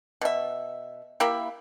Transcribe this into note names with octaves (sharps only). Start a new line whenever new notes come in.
B2 E5
A#3 E4 G4 E5